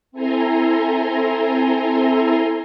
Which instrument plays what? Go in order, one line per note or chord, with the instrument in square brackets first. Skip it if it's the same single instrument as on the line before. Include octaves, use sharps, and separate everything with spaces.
[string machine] C4 E4 A4 G#5 A#5 C6